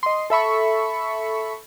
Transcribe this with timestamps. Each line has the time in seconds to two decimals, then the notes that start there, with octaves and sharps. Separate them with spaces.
0.03 D#5 C6
0.30 A4 E5 B5 C#6